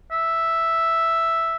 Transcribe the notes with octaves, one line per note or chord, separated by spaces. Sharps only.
E5